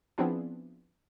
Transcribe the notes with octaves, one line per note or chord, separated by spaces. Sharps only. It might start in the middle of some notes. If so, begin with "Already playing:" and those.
F3 B3 C4 D4 E4 G#4